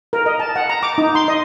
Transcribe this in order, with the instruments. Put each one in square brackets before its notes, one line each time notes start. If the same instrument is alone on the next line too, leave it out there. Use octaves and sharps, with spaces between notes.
[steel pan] A#4
D#5
A5
F#5
A#5
D6
D#4
C6
D#5